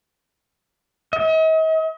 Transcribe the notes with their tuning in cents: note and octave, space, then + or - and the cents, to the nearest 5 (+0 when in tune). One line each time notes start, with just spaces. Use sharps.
D#5 +45